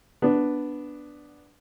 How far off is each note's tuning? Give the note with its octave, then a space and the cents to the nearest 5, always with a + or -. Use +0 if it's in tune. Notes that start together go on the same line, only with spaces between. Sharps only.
B3 +0 D4 +0